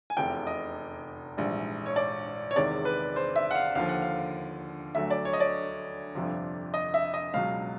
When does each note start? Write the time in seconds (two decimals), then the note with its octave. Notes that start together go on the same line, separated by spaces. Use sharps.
0.10 G#5
0.17 F1 E2 C3 G5
0.47 D#5
1.37 A#1 G#2 E3 G3
1.86 C#5
1.96 D5
2.51 C#5
2.56 E2 C3 D#3 G#3 D5
2.85 B4
3.16 C5
3.36 E5
3.51 F#5
3.55 F5
3.75 D#2 D3 F3 F5
3.89 F#5
4.02 F5
4.95 D2 D3 F#3 A3 E5
5.10 D5
5.25 C#5
5.33 D#5
5.40 D5
6.15 G1 F2 C3 F3
6.74 D#5
6.94 E5
7.14 D#5
7.34 C#2 B2 F#3 F5